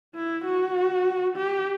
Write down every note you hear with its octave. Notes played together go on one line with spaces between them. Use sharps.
E4
F#4
G4